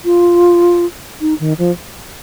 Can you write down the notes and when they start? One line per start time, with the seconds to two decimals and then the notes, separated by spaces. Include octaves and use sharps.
0.05 F4
1.21 D#4
1.40 D#3
1.58 F3